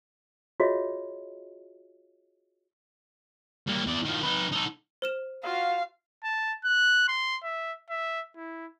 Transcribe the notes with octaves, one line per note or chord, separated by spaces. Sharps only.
F4 F#4 G#4 C#5 D#5 E5
G2 A#3
E2 D5
D#3 F3
D#4 B4
D#4 A4
C5 F6 E7
F4 F#4 F5
A5
F#6
C6
E5
E5
E4